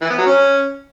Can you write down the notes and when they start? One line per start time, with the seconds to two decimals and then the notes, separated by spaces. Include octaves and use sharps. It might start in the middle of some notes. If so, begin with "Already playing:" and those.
0.01 E3
0.10 B3
0.18 F#3
0.26 C#4